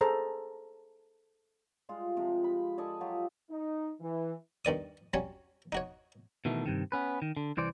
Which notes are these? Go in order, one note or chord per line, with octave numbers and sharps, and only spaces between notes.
G#4 A4 C5 A#5
G3 G#3 F4
C3 F3
B5
A4 D5 D#5 G#5
F#3 F4 G4
D#4
E3
G2 D#3 D5 D#6
F#3 G3 C#4 C#5
D#4 F#4 C#5
B2 D#3 E3 A3
G2 C3 D#3
B3 C#4 B4
D#3
D3
C2 E3 C5 D5